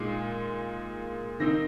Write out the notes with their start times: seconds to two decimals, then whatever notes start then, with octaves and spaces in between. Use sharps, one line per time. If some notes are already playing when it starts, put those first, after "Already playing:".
Already playing: A#2 G#3 D#4 C7
1.40 D#3 C4 D#4 A#6